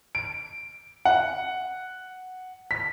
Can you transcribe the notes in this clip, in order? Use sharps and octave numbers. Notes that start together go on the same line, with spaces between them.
D7
F#5
B6